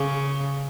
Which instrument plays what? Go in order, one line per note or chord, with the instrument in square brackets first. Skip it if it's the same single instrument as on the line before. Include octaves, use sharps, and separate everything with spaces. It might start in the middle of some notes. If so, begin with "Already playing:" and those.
Already playing: [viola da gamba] C#3 [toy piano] G#4